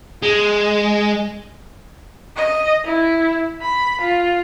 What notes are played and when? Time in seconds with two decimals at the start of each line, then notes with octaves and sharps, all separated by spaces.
0.22 G#3
2.36 D#5
2.85 E4
3.62 B5
4.01 F4